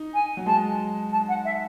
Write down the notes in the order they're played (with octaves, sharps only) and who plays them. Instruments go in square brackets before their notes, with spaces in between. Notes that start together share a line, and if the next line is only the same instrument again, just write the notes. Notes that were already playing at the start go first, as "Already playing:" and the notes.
Already playing: [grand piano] D#4
[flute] G#5
[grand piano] F#3
[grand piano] G#3 [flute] A5
[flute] A5
F#5
E5